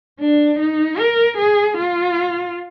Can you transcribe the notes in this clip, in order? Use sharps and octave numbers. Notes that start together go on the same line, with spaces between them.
D4
D#4
A#4
G#4
F4